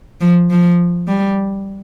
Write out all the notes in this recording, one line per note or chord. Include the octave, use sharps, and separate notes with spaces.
F3
F3
G3